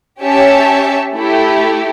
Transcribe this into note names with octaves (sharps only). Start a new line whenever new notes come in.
C#4 G4 C#5 E5 A5
A3 E4 G4